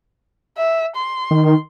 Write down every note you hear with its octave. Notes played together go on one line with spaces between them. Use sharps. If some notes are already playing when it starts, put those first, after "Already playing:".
E5
C6
D#3